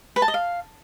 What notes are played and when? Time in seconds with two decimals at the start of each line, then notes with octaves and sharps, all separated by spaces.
0.16 B4
0.22 A5
0.28 D#5
0.34 F5